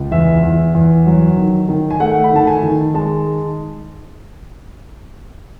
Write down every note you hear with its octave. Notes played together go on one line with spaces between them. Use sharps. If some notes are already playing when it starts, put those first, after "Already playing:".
Already playing: C#2
E2 E5
E2
E2
F#3
D#3
D#3
G#5
A3 F#5
B5
D#3 A5
G#5
D#3
G#3 A5